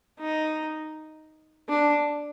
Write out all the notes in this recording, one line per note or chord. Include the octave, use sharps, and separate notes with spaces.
D#4
D4